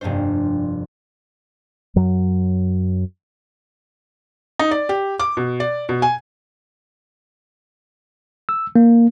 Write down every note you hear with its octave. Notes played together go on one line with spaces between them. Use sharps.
F1 G2 A#3 D4 C5
F#2 F#3
D#4
D5
G4
D6
B2
D5
B2
G#5
E6
A#3